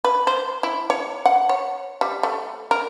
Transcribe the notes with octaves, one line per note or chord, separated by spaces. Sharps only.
B4
C5
E4
C#5
F#5
C#5
G3
A3
A#4